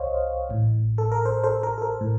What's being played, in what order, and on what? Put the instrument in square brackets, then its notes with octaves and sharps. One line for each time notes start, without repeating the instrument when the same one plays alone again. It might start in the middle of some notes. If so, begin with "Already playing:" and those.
Already playing: [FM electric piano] C2 C5 C#5 D#5 F5
A1 A2
A4
A#4
A4 C5
A4 C5
A#4
A4
A#4
A2